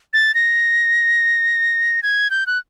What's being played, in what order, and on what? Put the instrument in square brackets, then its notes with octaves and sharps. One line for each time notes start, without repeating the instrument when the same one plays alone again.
[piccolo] A6
A#6
G#6
G6
F#6